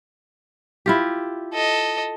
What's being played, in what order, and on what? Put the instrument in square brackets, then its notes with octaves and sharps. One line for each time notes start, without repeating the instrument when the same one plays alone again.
[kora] E4 F4 G4
[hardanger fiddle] A4 D#5